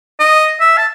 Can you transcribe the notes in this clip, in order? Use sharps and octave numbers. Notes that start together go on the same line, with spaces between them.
D#5
E5
A5